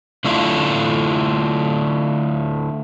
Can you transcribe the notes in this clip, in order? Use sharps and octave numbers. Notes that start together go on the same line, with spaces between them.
D3 A3 D4 E4 F4